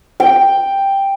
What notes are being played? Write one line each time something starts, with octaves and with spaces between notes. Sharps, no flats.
G5